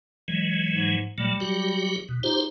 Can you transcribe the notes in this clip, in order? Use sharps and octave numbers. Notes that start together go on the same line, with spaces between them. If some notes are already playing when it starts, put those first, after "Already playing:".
E3 F#3 G#3
G#2
A#2 F#3 G3 A3
F#3 F#4 G4
B2
D#4 F4 G4 C5